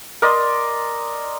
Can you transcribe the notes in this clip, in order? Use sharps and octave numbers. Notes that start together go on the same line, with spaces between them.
A#4 D5 D#5 C6